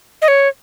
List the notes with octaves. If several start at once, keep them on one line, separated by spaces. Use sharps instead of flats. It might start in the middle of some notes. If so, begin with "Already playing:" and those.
D#5
C#5